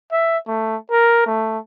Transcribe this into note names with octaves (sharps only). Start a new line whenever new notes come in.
E5
A3
A#4
A3